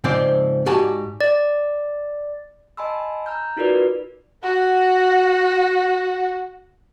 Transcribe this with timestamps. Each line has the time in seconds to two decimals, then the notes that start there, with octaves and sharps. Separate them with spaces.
0.04 G#2 C#3 F3 C4 C5 D5
0.66 G#2 F#4 G4 D5 G#5 A5
1.21 D5
2.77 D#5 G#5 A5 B5 C6 E6
3.26 A#5 F6 G6
3.57 D#4 F4 F#4 A#4 B4 D5
4.43 F#4 F#5